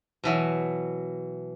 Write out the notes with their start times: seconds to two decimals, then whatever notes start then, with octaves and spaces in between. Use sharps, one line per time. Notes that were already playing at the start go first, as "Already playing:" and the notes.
0.24 B2 E3 F#3